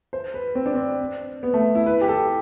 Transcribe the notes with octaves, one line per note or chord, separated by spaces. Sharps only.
C5
B4
C4
D4
C4
B3
A3
E4
B4
G4
A4